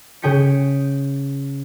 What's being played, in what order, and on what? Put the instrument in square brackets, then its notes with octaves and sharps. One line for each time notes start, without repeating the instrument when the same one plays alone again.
[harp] C#3 G#4 G5 B6 C#7